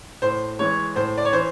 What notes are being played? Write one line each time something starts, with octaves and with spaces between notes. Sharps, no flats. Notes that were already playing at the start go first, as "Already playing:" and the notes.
A2 C5
E3 G#3 C#5
A2 C5
D5
C#5
E3 C5